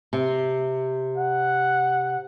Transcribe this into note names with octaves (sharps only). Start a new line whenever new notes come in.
C3
F#5